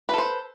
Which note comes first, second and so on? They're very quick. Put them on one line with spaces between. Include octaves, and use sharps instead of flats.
B4 A4 C5